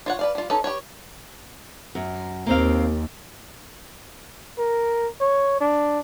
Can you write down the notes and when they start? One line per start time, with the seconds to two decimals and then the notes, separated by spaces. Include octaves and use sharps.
0.06 F4 C#5 F#5
0.19 B4 D5 F5
0.35 G3 F4
0.50 C#4 D#4 A4 B4
0.64 G4 B4 C#5
1.95 F#2
2.46 D#2 A#3 C4 F5
4.58 A#4
5.21 C#5
5.61 D4